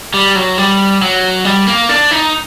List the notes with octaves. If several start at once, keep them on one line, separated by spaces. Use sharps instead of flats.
G3
F#3
G3
F#3
G3
A#3
D4
D#4